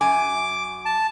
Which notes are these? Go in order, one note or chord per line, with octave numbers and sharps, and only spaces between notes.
F#2 G#5 D6
A5